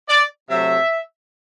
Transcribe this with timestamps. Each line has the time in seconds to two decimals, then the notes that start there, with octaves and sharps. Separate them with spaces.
0.09 D5
0.49 C3 F#3 A3 E5